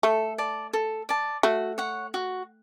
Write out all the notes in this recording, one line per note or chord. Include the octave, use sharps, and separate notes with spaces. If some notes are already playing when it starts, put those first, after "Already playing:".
A3 A4
D5 A5
A4
D5 A5
A3 F#4
C#5 F#5
F#4